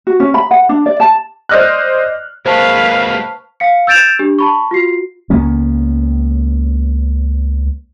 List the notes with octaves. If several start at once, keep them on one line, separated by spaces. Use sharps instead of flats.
F#4
C#4
B5
F#5
D4
D5
A5
C5 D5 D#5 F6 F#6
G#3 A#3 B4 C5 F5 A5 C#6
F5 C#7
E6 G6 A6 D7 E7 F7
D4 G4
A5 B5 C#6
F4 F#4 C7
C#2 A#3 B3 C#4